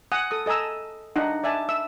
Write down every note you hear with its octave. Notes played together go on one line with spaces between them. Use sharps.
F#5 G#5 D#6
A4 D#6
A4 D#5 G#5 A#5 E6
D4 D#4 F#5
D5 E5 G#5 A5
E5 E6